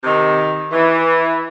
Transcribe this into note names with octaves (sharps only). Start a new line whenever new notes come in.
C3 D#3
E3